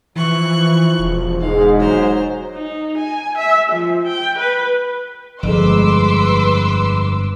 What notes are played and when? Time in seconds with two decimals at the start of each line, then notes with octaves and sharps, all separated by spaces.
0.16 E3 F3 C#6 F#6
0.99 E1
1.41 G#2 G#3 F5
1.79 F#3 C5 A#5
2.55 D#4
2.97 G#5
3.38 E5
3.72 F3
4.07 G5
4.38 B4
5.43 G1 F2 G#3 B4 C6 D6 E6